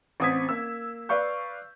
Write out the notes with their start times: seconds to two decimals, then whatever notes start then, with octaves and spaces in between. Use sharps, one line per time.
0.20 A1 C4 D#6 G#6 B6
0.49 A#3 E6
1.09 B4 D5 F5 C#6 G6